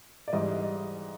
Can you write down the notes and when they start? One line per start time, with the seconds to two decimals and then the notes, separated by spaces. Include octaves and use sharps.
0.28 D5
0.33 G#2 E3 G3 D#5